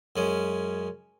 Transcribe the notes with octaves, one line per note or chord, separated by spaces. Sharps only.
F#2 G#3 C#4